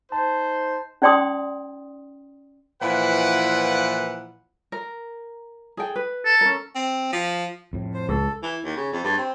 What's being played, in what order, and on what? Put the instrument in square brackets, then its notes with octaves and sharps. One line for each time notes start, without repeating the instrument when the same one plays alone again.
[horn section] D#4 C5 [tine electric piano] A5
[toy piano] C#4 D#4 D5 G5 C6 D#6
[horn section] A#2 E3 F3 E4 B4 F#5
[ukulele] A#4
G#4 A4 G5
B4
[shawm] A4
[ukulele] C#4 A#4
[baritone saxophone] C4
F3
[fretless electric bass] F2 A2
[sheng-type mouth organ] C5
[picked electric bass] C#2 [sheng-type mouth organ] A4
[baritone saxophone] E3
D#2
C#3
F2
G2
C4